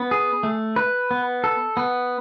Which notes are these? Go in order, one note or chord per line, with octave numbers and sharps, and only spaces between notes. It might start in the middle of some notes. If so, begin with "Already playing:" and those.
Already playing: B3
G#4
A3
B4
B3
A4
B3